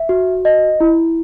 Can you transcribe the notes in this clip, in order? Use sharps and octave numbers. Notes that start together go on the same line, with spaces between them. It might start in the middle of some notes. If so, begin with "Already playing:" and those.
Already playing: E5
F#4
D#5
E4